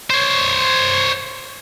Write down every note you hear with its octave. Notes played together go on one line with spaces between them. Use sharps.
C5 C#5